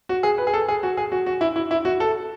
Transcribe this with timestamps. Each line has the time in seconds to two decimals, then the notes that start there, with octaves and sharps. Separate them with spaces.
0.09 F#4
0.23 G#4
0.38 B4
0.47 G#4
0.54 A4
0.68 G#4
0.83 F#4
0.97 G#4
1.12 F#4
1.26 F#4
1.41 E4
1.56 E4
1.71 E4
1.85 F#4
2.00 A4